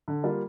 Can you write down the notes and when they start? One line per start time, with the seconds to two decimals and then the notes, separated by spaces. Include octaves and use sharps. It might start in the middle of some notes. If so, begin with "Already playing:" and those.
0.08 D3
0.24 G3 A#3 F4